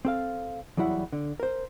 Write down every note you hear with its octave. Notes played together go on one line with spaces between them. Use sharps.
C4 A4 F5
E2 F#3 G3 E4 F#5
D3
A#4 C5